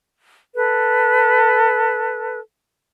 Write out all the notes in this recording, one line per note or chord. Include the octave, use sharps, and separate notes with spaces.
A4 B4